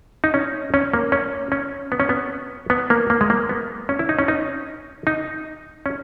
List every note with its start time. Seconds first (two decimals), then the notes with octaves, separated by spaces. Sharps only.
0.24 D#4
0.34 C#4
0.74 C#4
0.93 A#3
1.12 C#4
1.52 C#4
1.92 B3
2.00 C#4
2.09 B3
2.70 B3
2.90 A#3
3.10 A#3
3.21 G#3
3.30 A#3
3.49 B3
3.89 C#4
3.99 E4
4.09 D#4
4.19 C#4
4.28 D#4
5.07 D#4
5.86 C#4